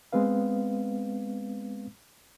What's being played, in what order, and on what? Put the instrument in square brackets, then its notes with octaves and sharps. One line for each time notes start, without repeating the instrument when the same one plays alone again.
[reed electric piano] G#3 B3 C4 B4 F5